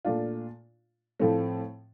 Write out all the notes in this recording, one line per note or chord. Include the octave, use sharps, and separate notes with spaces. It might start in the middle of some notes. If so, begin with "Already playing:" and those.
A#2 A3 D4 F4
A2 F3 A3 C4